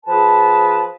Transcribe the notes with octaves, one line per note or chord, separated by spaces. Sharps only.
F3 G#4 B4 A5